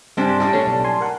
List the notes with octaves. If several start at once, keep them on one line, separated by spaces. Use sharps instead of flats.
G2 C3 G#3 D4 G4
A2 G3 D4
D3 A3 C#4
B1
G#5 C6
A#4 F#5